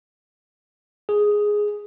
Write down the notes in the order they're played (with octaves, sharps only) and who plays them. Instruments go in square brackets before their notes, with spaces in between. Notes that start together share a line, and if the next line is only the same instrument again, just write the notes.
[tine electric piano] G#4